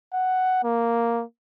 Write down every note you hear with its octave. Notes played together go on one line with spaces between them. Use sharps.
F#5
A#3